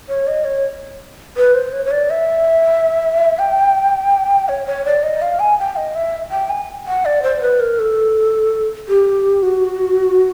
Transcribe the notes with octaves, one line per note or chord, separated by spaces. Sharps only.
C#5
D#5
C#5
B4
C5
C#5
C#5
D5
E5
G5
C#5
C#5
D5
D#5
F5
G#5
G5
D#5
E5
G5
G#5
F#5
D5
C5
B4
A#4
A4
G4
F#4